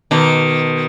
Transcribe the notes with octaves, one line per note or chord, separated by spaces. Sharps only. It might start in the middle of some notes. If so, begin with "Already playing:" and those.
B2 D#3